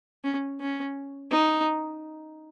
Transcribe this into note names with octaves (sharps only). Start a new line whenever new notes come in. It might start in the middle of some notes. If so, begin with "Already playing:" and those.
C#4
C#4
D#4